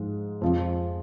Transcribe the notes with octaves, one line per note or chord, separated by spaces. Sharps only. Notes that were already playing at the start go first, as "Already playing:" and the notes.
Already playing: G#2 F3 G#3
F2 F3